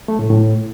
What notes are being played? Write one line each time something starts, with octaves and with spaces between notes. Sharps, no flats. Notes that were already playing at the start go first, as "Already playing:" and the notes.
A3
A2
A2